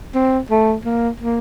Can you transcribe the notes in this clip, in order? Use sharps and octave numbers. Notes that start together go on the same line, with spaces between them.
C4
A3
A#3
A#3